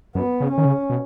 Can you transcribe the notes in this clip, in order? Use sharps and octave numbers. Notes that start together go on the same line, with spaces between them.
F#2 B3
C#3
C#4
D#3
C#3
B2